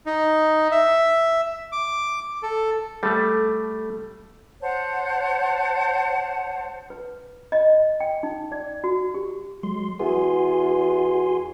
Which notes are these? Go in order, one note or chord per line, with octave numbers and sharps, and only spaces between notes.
D#4
E5
D6
A4
G3 A3 A4
C5 C#5 F#5 A5
B4
D#5
G5
D#4
D5
F#4
G4
F#3 G#3 C6
E2 F#4 G#5 C6